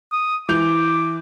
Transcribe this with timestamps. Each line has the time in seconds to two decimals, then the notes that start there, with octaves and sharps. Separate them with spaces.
0.12 D#6
0.49 E3 D6 G6 F7